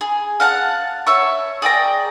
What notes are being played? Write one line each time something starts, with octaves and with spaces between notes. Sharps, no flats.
G#4
F5 F#5 A5
C#5 E5 C#6
G#4 D5 G5 A#5